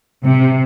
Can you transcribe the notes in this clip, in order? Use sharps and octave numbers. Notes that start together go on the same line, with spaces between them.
C3